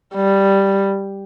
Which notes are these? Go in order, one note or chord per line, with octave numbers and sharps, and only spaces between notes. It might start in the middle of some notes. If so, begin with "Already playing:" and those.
G3